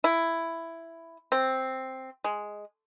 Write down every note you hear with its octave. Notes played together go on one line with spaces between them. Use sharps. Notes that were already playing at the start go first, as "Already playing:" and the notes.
E4
C4
G#3